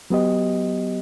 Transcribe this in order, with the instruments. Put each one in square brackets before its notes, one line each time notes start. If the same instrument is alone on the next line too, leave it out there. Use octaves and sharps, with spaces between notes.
[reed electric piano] F#3 B3 G4 D#5